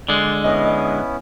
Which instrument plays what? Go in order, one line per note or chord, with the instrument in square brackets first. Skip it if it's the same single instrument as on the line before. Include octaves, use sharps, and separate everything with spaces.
[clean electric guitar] D3 G#3 [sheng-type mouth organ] D5
[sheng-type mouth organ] B3 C#4 E4 [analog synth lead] D#5